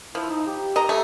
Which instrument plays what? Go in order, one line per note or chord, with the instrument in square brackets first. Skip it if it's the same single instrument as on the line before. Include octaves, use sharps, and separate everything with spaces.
[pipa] F3 [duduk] E4
[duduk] D#4
G4
[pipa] D#5 A#5
A3